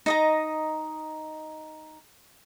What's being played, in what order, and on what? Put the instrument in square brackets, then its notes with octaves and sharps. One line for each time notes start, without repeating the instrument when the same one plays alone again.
[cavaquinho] D#4 D#5 A#5